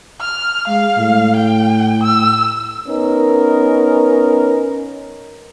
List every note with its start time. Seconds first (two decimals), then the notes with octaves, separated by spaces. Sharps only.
0.21 F6
0.68 G#3 F5
0.98 A2
1.37 G5
2.04 E6
2.88 B3 C#4 D#4 A#4